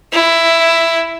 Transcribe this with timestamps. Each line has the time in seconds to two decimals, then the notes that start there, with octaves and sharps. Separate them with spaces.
0.13 E4